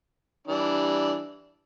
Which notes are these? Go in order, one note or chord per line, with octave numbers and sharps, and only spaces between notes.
E3 G3 D4